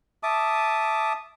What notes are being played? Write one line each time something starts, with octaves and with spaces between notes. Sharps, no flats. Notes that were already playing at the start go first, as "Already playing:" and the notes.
E5 A5 D6 D#6